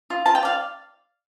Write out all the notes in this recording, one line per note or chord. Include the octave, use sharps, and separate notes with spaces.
F4
F4 A5
G5
D5 F5